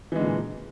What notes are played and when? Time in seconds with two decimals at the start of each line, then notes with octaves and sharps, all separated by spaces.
0.12 E3
0.16 G#3
0.19 D3
0.23 A#2